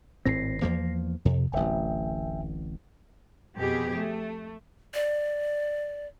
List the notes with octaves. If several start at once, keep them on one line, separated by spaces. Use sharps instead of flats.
G#1 A2 C4 A#6 C7
E2 F3 A#3
F2 C3
D1 A1 E5 G5 G#5
F2 B2 G4 G#4
A3
D5